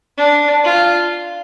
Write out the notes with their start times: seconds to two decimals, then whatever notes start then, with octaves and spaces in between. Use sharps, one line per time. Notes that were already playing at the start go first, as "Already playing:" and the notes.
0.18 D4
0.64 F4